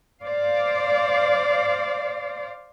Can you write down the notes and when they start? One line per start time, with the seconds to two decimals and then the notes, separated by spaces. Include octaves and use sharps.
0.22 C5 D5 F5